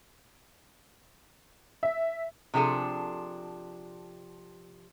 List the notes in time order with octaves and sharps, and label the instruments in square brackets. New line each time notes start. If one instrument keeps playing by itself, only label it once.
[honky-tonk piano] E5
[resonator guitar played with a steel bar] C3 F3 D4 G#4 A4